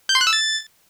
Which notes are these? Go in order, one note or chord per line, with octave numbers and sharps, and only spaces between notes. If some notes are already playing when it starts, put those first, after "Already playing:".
G6
C6
F#6
E6
A6